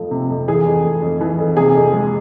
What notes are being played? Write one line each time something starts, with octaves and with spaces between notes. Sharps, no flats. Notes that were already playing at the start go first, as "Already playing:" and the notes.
Already playing: F2 F3 A3
C3
F2
E3 G#4
F2
A3
F2
E3
F2
C3 G#4
F2
G#3